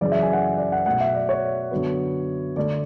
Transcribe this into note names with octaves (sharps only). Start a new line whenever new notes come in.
F#2 C#3 E3 D5
E5
G#5
F#5
D5
F#5
B2 F#3 A3 F#5
E5
D5
C#5
F#2 D3 F#3 B3
D3 A3 D4 D5